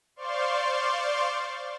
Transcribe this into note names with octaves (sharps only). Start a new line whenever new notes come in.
C5 D5 F5 C6 C#6